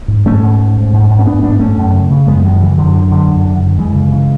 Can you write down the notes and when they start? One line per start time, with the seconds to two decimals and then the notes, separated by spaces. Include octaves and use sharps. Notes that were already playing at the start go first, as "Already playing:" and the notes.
0.08 G#2
0.25 G#2 A3 C#4
0.43 G#2
0.59 G#2
0.77 G#2
0.93 G#2
1.10 G#2
1.19 C#4
1.26 G#2 B3 D4
1.43 G#2 B3 D4
1.59 G#2 A3 C#4
1.77 F#2
1.93 C#3
2.10 C#3
2.27 F#2 G#3 B3
2.44 F#2 E3 G#3
2.60 C#3 E3
2.77 F#2 D3 F#3
2.95 D3
3.11 D3
3.28 F#2
3.45 F#2
3.62 D3
3.78 F#2 E3 G#3
3.95 C#3
4.12 C#3